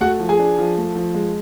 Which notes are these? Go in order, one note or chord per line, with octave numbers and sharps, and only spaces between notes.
A3 F#4 F#5
F3
G#4 G#5
D4
F3
A3
F3
G#3